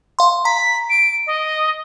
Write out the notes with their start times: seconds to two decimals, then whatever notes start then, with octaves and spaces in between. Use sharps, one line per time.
0.19 F5 C6
0.45 A#5 B6
0.90 D7
1.27 D#5